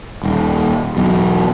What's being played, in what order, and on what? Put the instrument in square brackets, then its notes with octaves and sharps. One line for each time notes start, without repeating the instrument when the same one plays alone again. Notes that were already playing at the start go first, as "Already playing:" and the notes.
[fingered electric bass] D#1
B1 E2